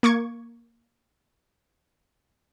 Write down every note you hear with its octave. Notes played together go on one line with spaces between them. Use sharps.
A#3 C#6 D6 G#6